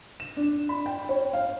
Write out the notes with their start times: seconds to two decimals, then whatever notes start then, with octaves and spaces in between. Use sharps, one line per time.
0.20 E7
0.37 D4
0.69 B5
0.86 G5
1.09 C#5
1.33 F5